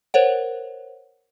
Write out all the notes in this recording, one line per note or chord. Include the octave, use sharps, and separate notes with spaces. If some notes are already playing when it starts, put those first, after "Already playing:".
A#4 C5 C#5 F#5